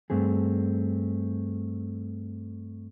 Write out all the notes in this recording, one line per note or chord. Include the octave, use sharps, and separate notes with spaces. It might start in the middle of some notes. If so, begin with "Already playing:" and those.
G2 A3 C4 G#4